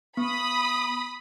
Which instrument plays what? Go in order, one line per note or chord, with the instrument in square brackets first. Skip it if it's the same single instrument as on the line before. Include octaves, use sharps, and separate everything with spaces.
[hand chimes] B3 [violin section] B5 D#6